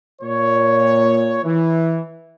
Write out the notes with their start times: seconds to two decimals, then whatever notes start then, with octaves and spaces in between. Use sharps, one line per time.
0.22 A#2 C#5
1.44 E3